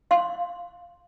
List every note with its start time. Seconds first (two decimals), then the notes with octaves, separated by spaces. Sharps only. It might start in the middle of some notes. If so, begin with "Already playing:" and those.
0.11 F5 C6